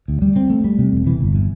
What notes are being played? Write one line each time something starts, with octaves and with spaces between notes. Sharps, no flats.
D2
G3
C4
A3
G3
C3
E1
E3
G1
E3